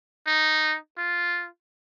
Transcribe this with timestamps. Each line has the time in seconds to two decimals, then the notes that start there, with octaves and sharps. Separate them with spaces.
0.27 D#4
0.98 F4